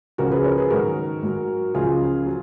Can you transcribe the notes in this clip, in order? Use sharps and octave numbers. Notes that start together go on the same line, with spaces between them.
C#2 C#3 F3 F#4 A#4
G#4 B4
A#4 C#5
G#4 B4
G#2 D#3 F#3 F#4 A#4
G#2 F#3
C#2 C#3 F3 F4 G#4
F#3